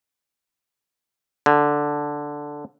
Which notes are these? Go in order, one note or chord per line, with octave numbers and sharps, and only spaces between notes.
D3